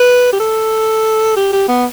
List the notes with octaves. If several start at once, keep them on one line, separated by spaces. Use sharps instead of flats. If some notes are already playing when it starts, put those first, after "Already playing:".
Already playing: B4
G4
A4
G4
G4
B3